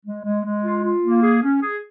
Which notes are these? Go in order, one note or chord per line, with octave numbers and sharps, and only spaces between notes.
G#3
G#3
G#3
F4
F4
A#3
G#4
C#4
G#4